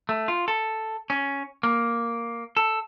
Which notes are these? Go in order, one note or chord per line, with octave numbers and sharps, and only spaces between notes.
A3
F4
A4
C#4
A#3
A4